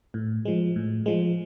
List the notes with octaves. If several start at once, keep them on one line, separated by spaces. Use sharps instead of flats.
A2
F3 G#3
A2
F3 G#3